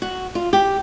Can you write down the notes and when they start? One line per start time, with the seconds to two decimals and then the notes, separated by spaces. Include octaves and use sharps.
0.02 F#4
0.35 F4
0.53 G4